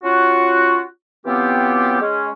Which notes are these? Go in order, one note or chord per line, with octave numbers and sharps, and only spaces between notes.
C#4 F4 F#4
E3 F#3 B3 C4 F4 G4
G#3 C#4